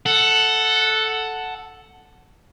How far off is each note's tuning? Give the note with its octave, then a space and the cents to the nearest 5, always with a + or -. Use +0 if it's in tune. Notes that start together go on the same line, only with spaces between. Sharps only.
A4 +0 F#5 +0